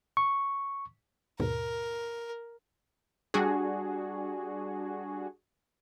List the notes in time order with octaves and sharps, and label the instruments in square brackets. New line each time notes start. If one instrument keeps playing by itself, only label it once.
[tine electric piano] C#6
[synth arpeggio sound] D#2 G#2 B2 [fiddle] A#4
[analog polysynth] G3 D4 F#4 G#4